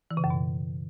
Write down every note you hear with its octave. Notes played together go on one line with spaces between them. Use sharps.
E3
C#3
F#2
B2